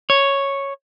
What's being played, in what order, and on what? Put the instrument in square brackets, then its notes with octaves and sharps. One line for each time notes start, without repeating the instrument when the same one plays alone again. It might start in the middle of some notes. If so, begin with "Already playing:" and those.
[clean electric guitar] C#5